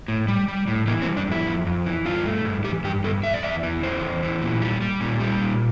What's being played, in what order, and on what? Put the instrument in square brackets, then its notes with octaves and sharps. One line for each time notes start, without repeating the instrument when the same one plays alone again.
[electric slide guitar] A2
G3
G3
A2
E3 A#3
C4
G3
D4
F2 E4
F2
F2
E3
G2 F4
A3
G2
E3 G4
G2 G4
G2 A4
E2 E5
D5
E2 E5
E3
E2 C5
E2
E3
A#2
G3
G3
A#2
G3
A#2